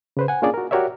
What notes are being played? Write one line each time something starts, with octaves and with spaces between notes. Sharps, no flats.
C#3 B4 C5
F#5 G#5
A#3 C#4 D4 F4 G#4 D5
F#4 A#4
F#4 G4 A#4 C#5 D5 E5